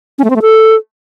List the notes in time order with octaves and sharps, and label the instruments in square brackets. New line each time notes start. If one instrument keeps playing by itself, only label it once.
[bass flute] C#4
A3
C4
A3
A4